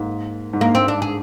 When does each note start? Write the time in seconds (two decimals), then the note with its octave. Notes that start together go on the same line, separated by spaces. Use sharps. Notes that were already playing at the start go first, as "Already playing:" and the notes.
Already playing: G#2 A#3
0.53 G#2
0.61 G2 A#3
0.75 C4
0.88 D4
1.02 G#4